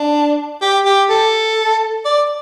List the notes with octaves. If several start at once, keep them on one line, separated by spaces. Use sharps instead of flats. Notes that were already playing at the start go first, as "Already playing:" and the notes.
Already playing: D4
G4
G4
A4
D5